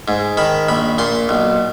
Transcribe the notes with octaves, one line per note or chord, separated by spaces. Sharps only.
G#2
D#3 B5
A#1 B5
A#2 C6
B1